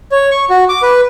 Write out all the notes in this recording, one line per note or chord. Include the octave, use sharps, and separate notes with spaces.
C#5
C#6
F#4
D6
B4